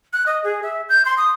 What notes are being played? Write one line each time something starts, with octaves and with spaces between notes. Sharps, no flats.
F#6
D#5
G#4
E5
G6
C6
D#6